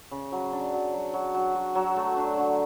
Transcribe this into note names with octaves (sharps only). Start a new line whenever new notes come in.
C#3
F#3
D4
F#3
F#3
F#3
F#3
F#4
F#3
A3
D4
D3